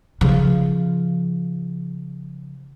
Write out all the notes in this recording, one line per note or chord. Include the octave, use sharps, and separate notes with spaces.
C#3 F3